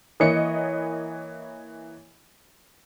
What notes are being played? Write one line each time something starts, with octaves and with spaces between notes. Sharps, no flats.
E3 A#3 C#5 D#5 C#7